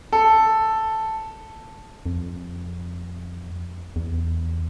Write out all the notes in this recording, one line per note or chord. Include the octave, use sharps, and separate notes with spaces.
A4
F2
E2